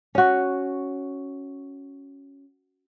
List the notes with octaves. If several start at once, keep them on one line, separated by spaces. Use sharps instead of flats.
C#4 F#4